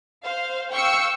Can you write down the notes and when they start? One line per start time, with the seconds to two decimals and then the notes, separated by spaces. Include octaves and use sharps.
0.22 C5 F5
0.71 F5 G5 C#6 E6 C#7